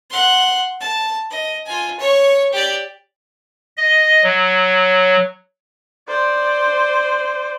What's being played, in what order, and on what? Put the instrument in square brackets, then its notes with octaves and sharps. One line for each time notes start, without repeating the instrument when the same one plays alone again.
[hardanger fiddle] F#5 C6
A5
D#5
F4 G#5
C#5 C#6
G4 D5
[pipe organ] D#5
F#3
[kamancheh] C5 D5